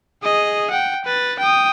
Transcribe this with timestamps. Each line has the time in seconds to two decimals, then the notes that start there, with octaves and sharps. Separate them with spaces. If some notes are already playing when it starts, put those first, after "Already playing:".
0.23 G#4 D#5
0.71 F#5 G5
1.05 B4 A6
1.40 G5 D#6